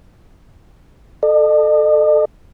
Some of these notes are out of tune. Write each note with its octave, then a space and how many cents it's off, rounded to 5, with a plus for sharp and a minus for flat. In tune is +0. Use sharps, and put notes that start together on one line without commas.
A4 +0 D#5 -45